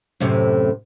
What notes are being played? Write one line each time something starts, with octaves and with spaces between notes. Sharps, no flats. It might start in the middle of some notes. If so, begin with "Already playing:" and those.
F#2 A2 C3